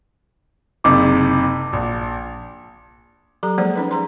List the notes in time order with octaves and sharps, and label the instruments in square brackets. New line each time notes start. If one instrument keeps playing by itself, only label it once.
[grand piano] F#1 C3 D#4 [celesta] D6
[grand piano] A#1
[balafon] F#3 G4 A4 A#5
F3 G#3 A#3 G#4 C5 D5
C#4 D#4 B4
G#4 A#5 C6